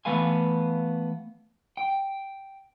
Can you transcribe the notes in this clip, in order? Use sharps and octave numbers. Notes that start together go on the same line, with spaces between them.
E3 A3 B3 B4 F5 G#5
G5